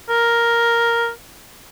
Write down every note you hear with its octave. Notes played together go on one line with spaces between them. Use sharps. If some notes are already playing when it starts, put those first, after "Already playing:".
A#4